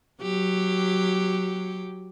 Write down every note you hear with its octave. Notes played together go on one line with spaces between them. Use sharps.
F#3 G4